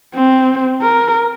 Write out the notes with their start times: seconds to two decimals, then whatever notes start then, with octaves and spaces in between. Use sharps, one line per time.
0.15 C4
0.82 A#4